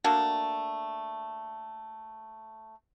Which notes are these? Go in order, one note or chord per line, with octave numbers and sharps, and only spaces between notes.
A3 A#3 D4 F#4